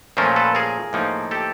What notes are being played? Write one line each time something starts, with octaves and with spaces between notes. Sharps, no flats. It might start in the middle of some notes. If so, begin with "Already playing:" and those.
A#2 F3 A3 C#4 F4 A#4 C5
A4 B4
G#4 A#4
A2 F3 A#3 D#4
G4 A4